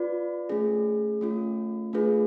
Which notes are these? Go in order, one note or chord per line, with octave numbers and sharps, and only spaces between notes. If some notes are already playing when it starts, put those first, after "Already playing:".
Already playing: F4 B4 D5
A3 C#4 G#4
A3 C#4 F4
A3 D4 F4 G#4 B4